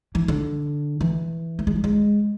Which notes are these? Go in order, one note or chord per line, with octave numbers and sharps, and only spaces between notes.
E3
D3
E3
A3
G#3
F#3
G#3